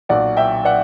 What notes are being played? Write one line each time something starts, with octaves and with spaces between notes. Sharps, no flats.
B1 A#2 F#3 D5 F#5
E5 G5
D5 F#5